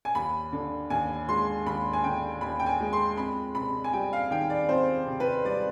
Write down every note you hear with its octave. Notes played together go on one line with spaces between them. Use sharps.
G#5
D#2 B5
D3
D#2 G#5
G#3 C6
D#2 B5
G#5
D3 G5
D#2 B5
G5
G#5
G#3
C6
F2 B5
C3 B5
G#5
G3 G5
F5
D#3 G5
D5
F2 C5
C3
B4
G3 D5